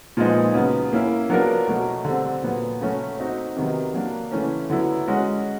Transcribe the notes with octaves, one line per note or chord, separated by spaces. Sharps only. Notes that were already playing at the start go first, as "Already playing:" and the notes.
A#2 F3 G#3 B3 D#4
C#3 F#3 B3
A#3 C#4 E4
F#3 B3 D4 F4 A#4
B2 F#3 A3
D3 G3 C4
A#2 F#3 B3
C#3 F#3 A3 C#4 F#4
C4 D#4 F#4
C3 D#3 F#3 B3
F#3 A#3 D4
C#3 E3 A3 C#4
D3 F#3 B3 E4
G#3 C#4 F#4